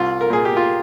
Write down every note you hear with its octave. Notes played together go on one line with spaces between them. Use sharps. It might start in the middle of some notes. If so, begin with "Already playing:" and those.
Already playing: C2 F4
A#4
A#2 G#4
G4
F4